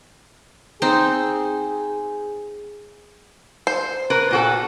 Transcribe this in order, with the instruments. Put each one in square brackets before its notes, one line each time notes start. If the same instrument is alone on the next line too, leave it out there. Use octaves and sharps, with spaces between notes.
[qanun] C4 D#4 C5 [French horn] G#4
[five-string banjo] C5
[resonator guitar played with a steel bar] A#4 B4
A#2 F#4 A4